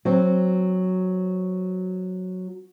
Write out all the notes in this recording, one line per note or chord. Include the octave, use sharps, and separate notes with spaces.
F#3 C4